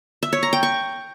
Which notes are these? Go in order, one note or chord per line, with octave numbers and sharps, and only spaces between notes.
E5
C#5
A#5
G5
C#6